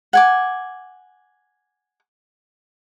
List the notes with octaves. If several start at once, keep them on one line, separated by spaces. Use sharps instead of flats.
F#5 G#5 D6